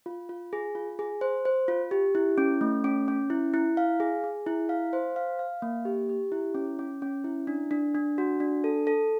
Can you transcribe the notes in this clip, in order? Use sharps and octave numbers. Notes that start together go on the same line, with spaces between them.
F4
F4
G#4
F4
G#4
C5
C5
F4
G4
E4
C#4
A3
C#4
C#4
E4
E4
F5
G#4
G#4
E4
F5
C5
F5
F5
A#3
G4
G4
E4
C#4
C#4
C#4
E4
D4
D4
D4
F#4
D4
A4
A4